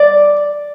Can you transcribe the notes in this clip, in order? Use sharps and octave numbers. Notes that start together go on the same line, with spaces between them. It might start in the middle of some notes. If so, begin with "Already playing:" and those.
Already playing: D5